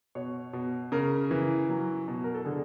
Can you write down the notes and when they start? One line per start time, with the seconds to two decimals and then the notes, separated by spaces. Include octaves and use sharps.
0.15 B2 C#5
0.53 B2
0.92 C#3 A#4
1.31 E3
1.69 F#3
2.08 B2
2.24 A#4
2.34 A4
2.45 D3 G#4